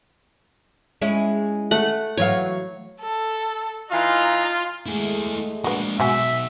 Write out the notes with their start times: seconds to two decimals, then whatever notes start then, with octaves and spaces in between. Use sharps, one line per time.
1.02 G#3 C#4 E4
1.71 A3 F#5
2.17 E3 F#3 C#5 F5
3.00 A4
3.91 E3 D#4 F4 F5
4.86 G#3 A3 E4 G#4
5.64 G#3 A#3 D4 F#4 B4
6.00 B1 B2 F#4 E5 F#5 G#5